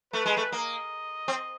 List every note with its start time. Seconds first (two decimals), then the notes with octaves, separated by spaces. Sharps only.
0.13 A3 B4
0.26 G#3
0.37 A3
0.52 A#3 D#5
1.28 C4